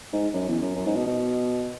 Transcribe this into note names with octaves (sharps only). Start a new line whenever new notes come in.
G#2
F#2
E2
F#2
F#2
G#2
B2
B2